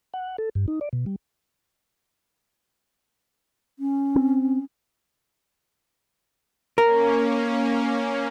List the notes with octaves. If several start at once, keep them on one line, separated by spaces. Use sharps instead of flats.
F#5
A4
G2
D#4
D5
B2
G3
C#4
C4
A#3 C#4 A#4